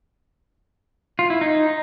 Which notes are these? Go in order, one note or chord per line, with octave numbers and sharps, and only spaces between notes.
F4
E4
D#4